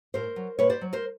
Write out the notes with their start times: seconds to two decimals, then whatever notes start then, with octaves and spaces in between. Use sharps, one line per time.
0.14 A2 A#4 C5
0.36 F#3
0.59 A#2 B4 C#5
0.70 C5 D5
0.81 F#3
0.93 A#4 C5